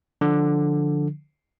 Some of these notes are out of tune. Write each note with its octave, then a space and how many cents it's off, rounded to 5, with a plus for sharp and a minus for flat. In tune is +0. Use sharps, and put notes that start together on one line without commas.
D3 +0 F3 +0